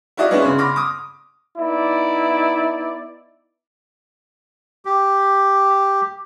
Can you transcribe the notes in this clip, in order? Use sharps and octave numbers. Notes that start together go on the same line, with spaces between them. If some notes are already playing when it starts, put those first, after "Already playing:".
E4 F#4 D5 D#5 F5
B3 C#4 D4 E4 G#4
C#3 B3 C6
B5 C6 D6 F6 A#6
D6 D#6
B3 D#4 E4 D5
G4